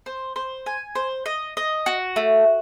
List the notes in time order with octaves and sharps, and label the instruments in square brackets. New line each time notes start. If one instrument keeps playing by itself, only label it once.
[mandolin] C5
C5
G#5
C5
D#5
D#5
F#4
A3